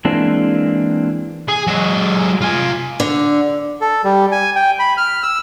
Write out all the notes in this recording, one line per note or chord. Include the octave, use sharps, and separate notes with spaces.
E3 G#3 A#3 C4 D4
G#4
F#3 G#3
F4 G#5
D3
A4
G3
G#5
G5
B5
F6
E6